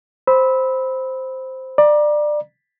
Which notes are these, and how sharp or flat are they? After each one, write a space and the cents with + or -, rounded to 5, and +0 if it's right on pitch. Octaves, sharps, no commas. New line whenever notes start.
C5 +0 B5 +0 E6 -25
D5 +20 A#5 +35